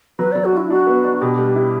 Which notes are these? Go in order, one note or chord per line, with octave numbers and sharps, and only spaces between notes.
F#3 B4
F#3 D5
F#4
D4 E4
D4 F#4
B3
D4
B2 G4
G3
E4